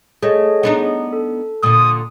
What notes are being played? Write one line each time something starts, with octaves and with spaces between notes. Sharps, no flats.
A3 G#4 C#5 D#5
B3 D4 D#4
A4
A#2 D3 D#6